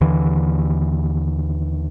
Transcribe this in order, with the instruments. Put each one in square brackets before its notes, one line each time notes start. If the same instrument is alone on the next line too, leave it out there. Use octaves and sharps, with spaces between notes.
[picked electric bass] D#2 D3 E3